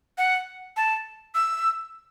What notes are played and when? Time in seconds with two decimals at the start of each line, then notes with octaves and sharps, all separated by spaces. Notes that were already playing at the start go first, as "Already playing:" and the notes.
0.18 F#5
0.77 A5
1.35 E6